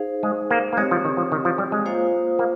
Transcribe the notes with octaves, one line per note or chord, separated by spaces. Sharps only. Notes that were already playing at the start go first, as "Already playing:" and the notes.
Already playing: D#4 G#4 C5 F5
G#3
A#3
A#3
G#3 C4 G4 C#5
F3
D#3
F3
D#3
F3
G3
G#3
A#3 F4 C5 F5
A#3